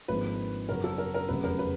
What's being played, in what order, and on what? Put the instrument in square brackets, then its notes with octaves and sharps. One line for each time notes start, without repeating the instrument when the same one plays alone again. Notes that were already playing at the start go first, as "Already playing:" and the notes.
[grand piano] G#1 G#2 F3 A#3 D4 [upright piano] B4
[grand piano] F#2 C#3 F#3 B3 [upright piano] A#4
[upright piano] A4
A#4
A#4
[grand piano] F1 E2 C#3 F#3 B3 [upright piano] B4
[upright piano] A#4
B4